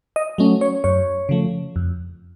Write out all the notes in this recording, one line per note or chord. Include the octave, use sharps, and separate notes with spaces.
D#5
F#3 A3 C#4
C#5
F#2 C#5
C#3 F3 A3
F2